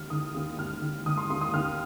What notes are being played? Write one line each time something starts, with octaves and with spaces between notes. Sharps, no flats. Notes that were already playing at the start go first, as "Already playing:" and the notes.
Already playing: D#2 D#3 F6
D#3 D#6
D#2
D#2 F6
D#3
D#3 D#6
C6
D#2 C6
D#6
D#2 F6